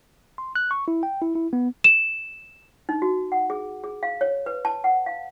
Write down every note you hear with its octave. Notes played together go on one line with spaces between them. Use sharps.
C6
F#6
C#6
E4
G5
E4
E4
B3
E7
D#4
F#4
F#5
G#4
G#4
F5
C#5
B4
A5
F#5
F5